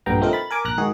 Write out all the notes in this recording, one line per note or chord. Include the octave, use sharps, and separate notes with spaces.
A#1 G2 D3 B3 G5 A#5
F3 A3 C4 D#4 A#4
B5 A6
A#4 G#5 D6
A#1 A#5 F#6 A#6
G#2 D#3 F#4 G#4